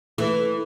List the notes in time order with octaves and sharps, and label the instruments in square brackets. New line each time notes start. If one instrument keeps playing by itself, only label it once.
[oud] E3 [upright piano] A3